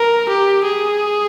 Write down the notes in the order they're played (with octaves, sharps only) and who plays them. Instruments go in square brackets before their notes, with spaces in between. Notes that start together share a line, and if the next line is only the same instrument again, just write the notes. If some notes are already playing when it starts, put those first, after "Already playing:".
Already playing: [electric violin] A#4
G4
G#4